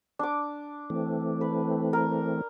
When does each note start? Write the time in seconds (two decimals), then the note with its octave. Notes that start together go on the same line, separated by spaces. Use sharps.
0.19 D4 D6
0.90 E3 A3 C4
1.41 B4
1.93 A#4